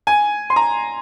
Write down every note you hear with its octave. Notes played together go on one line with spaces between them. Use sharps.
G#5
C6
A#5